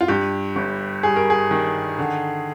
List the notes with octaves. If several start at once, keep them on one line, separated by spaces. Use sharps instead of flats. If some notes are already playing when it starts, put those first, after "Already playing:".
F4
G2 G4
G1
G3 G#4
A#4
G#4
D#3
D3